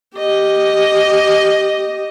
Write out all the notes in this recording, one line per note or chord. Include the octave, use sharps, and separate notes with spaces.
G4 D#5